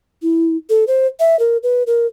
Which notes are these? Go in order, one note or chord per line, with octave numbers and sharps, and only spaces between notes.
E4
A4
C5
E5
A#4
B4
A#4